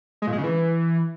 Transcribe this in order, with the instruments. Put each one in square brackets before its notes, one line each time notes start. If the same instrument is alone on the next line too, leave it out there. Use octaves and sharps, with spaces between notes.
[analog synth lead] G#3
A#2
G#3
C#3
E3